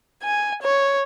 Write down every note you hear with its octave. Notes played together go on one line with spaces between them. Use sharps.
G#5
C#5